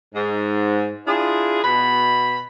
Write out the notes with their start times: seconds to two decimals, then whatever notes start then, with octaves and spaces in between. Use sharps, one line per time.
0.15 G#2
1.07 D4 E4 F4 G#4
1.64 B2 B5